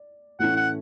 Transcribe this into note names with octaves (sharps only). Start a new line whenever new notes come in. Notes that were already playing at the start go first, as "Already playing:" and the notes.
Already playing: D5
A2 E3 A3 C#4 F#5
F#5